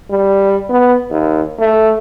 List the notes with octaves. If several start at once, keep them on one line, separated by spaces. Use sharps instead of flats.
G3
B3
D#2
A3